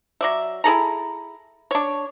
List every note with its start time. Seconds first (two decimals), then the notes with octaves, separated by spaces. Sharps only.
0.21 F#3 D5 E5
0.64 E4 G#4 A4 A#5
1.71 D4 C#5